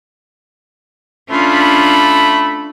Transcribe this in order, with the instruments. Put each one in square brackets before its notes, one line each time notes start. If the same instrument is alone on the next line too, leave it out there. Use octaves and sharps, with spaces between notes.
[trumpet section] A3 B5 [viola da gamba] C#4 D4 F4